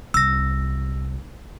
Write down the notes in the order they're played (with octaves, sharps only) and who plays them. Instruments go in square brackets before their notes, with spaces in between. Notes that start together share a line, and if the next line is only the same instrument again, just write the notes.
[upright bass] C2 [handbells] E6 A#6